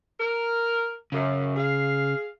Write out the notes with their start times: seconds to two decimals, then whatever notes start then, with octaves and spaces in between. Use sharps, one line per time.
0.19 A#4
1.12 F#2 C#3
1.56 G#4 F5